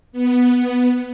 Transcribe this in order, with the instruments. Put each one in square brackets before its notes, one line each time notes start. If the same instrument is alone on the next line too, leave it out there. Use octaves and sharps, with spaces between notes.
[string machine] B3